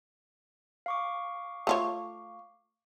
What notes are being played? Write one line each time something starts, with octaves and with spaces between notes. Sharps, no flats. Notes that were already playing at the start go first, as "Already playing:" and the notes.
F5 C#6 D6
A3 F4 C#5